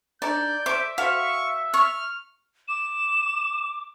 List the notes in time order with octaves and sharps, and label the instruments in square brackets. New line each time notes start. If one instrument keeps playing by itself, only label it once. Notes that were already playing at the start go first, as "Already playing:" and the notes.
[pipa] D4 D#4 A4 [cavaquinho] D5 [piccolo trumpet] G6
[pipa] A4 C5 [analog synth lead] E5 [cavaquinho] D6
[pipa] F#4 A4 C5 [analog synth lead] E5 [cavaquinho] F5 [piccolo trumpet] C#6
[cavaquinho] C#6 [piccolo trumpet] F6
[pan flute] D6 [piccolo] E7